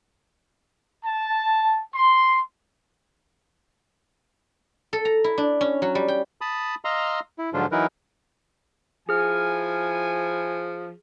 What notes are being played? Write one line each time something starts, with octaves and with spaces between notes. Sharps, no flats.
A5
C6
A4
A#5
E4
D4
C#4
F#3
G3
G5
A5 B5 D#6
D#5 F5 A#5 C6 E6
E4
G#2 D3 F3 F#3 D4 F4
E3 F#3 D#4 E4 A#4 B4
F3 E4 G#4 G#5 F6